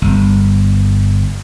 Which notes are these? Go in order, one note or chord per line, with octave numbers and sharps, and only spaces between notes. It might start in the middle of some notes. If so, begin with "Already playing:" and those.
G1